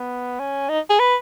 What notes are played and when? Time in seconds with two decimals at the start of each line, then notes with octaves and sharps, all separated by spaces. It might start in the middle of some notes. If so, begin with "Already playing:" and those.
Already playing: B3
0.39 C#4
0.69 D#4
0.90 G#4
0.99 B4